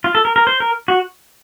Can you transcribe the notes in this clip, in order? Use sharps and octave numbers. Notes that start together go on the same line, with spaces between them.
F4
A4
A#4
A#4
C5
A#4
F#4